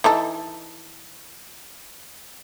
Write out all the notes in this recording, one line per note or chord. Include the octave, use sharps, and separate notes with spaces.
E3 D#4 A4